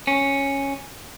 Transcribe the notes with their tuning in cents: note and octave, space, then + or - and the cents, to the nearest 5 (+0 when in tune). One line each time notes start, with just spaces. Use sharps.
C#4 -5